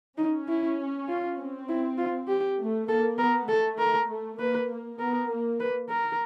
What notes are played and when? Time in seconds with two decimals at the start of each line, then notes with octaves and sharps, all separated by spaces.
0.18 C#4 D#4
0.48 E4
1.09 F4
1.39 C4
1.69 E4
1.98 F4
2.28 G4
2.58 A3
2.89 A#3 A4
3.18 B3 A#4
3.48 A3 A4
3.79 A#4
4.08 A3
4.39 A#3 B4
4.69 A#3
4.99 B3 A#4
5.29 A#3
5.60 B4
5.89 A#4